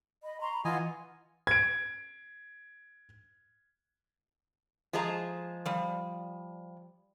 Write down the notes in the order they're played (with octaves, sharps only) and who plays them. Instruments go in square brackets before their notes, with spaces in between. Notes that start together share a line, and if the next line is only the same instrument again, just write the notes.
[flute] D#5 [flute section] B5
[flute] A#5 [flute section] C6 C#6
[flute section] B5
[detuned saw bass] E3 [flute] F4 [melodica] D#5 G#5 [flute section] F#5
[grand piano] G#6 D7
[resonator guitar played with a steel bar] F3 G#3 G#4 A5 A#5
F3 G3